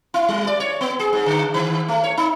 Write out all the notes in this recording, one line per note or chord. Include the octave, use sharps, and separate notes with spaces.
E4
G3
D5
C#5
B3
G#4
G#2
D3
D#3
A3
C#5
D#4